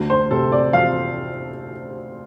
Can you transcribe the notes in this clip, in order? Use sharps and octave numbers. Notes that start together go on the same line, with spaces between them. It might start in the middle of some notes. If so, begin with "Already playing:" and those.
Already playing: D2
C5
C3 A4
D5
F3 F5